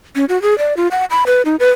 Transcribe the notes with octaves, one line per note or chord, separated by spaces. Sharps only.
C#4
F#4
G#4
D5
F4
F#5
B5
B4
D#4
B4